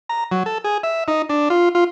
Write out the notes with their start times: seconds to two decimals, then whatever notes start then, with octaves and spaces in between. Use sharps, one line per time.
0.09 A#5
0.32 F#3
0.46 A4
0.64 G#4
0.83 E5
1.08 D#4
1.29 D4
1.50 F4
1.75 F4